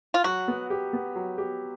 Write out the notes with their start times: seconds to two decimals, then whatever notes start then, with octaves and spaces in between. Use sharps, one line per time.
0.14 F4
0.24 F#3 F#4
0.48 B3
0.70 G4
0.93 B3
1.15 F#3
1.38 G4